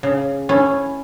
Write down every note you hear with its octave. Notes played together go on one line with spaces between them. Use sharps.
C#3
C#4 E4